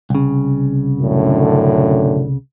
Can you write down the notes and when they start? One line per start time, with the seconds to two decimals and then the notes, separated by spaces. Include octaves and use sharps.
0.10 C2 C#3
1.00 F#2 A2 D3